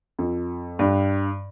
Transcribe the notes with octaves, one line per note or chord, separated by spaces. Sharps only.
F2
G2